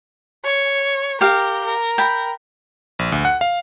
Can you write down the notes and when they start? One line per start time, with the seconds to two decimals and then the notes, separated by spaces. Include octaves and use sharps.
0.44 C#5
1.21 G4 A#4 F5
1.64 A#4
1.98 G5 B5
2.99 A#1
3.12 D2
3.25 F#5
3.41 F5